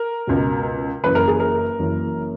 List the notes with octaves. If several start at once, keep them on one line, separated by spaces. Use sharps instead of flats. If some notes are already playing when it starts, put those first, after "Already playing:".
Already playing: A#4
C#2 B2
F#1 F#2 E3 B4
A#4
G#4
A#4
F#1 F#2 E3